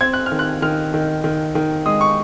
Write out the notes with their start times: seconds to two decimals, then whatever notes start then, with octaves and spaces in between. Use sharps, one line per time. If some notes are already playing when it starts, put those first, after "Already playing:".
0.01 C4 G#6
0.13 F#6
0.26 F6
0.32 D#3
0.39 F#6
0.62 D#3 F6
0.94 D#3
1.24 D#3
1.55 D#3
1.86 G#3 D#6
2.01 C#6